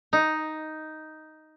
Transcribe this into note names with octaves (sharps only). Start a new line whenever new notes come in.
D#4